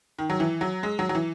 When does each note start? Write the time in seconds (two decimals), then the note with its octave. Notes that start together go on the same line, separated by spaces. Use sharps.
0.19 D#3
0.30 F#3
0.40 E3
0.61 F#3
0.83 G#3
0.99 F#3
1.09 F#3
1.15 E3